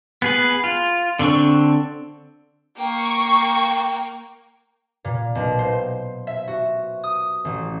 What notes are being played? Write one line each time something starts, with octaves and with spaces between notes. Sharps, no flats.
B3 G#4 B4
F4
D3 C4 D4 C#6
A#3 G5 C#6 C#7
A#2
B1
C5
E5
F#4
D#6
A1